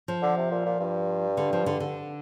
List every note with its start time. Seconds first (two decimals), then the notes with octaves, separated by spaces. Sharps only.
0.08 F3
0.23 D3
0.37 C3
0.51 A#2
0.66 A#2
0.80 G2
1.37 D3
1.53 F3
1.66 D3
1.80 D3